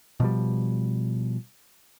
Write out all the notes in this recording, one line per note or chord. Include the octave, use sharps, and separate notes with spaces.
B2 F3 G3